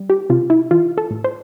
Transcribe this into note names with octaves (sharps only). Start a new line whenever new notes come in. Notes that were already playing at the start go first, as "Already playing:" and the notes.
Already playing: G3
G4
C3 F4
E4
E3 F4
A4
A2
C5